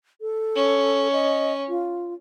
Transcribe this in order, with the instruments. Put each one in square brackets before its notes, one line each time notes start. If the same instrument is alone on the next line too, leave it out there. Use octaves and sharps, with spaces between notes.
[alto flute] A4
[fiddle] C#4
[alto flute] D#5
F4